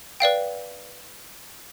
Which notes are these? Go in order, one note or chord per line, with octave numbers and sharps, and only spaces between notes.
B4 D5 F5 G5